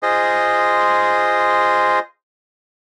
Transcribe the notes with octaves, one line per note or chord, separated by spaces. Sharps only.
F4 G#4 C5 D#5